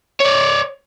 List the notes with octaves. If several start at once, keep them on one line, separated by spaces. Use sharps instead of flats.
C#5 D5